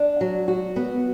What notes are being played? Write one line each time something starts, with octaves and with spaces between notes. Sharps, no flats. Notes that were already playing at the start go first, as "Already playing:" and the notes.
Already playing: D4
F#3
F#4
B3